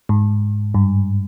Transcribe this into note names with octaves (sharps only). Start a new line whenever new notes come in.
G#2
G2